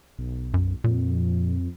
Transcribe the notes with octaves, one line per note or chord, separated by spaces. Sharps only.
B1
F#2
F2 A#2